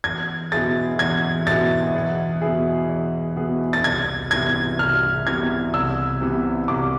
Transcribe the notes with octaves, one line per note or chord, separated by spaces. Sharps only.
E2 G#6
B2 B3 E4 G#4 A6
E2 G#6
B2 B3 E4 G#4 A6
E2
B2 B3 E4 G#4
E2
B2 B3 E4 G#4
A6
C2 G#6
C3 E3 B3 G#6
C2 F6
C3 E3 B3 G#6
C2 E6
C3 E3 B3
C2 D6